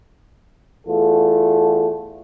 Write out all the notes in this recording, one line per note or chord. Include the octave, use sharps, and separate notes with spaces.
E2 A3 F4 A4